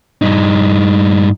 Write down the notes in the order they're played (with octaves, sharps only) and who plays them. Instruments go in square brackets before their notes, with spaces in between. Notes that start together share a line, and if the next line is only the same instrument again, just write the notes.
[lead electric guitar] G2 D#4